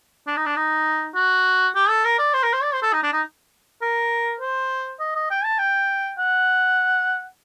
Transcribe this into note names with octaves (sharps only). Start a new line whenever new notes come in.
D4
D#4
D4
D#4
F#4
G4
A4
A#4
D5
C5
A#4
C5
D5
C5
A4
D#4
D4
D#4
A#4
C5
D#5
D#5
G5
A5
G5
F#5